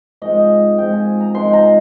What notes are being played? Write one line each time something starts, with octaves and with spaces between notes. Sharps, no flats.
G#2 F3 G#3 C4 D#5
G#2 F3 G#3 C4 G5
G#5
A#5
G#2 F3 G#3 C4 C6
A#5